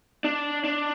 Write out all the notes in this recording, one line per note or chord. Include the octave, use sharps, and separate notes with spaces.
D4
D4